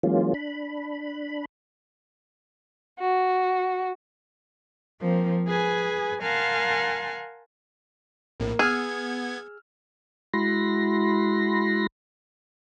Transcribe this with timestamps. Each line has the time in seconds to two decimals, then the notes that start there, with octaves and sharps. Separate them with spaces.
0.03 E3 F#3 G#3 A#3 C#4 F4
0.34 D4 B5
2.99 F#4
4.99 F3 A#3 C4
5.46 G#4 B4 G#5
6.22 A#4 F5 F#5 G#5 A5 C6
8.40 A#1 A2 A#3
8.59 B3 G#4 E6 F6 G#6
10.33 G#3 E4 F#4 B5 C6 A#6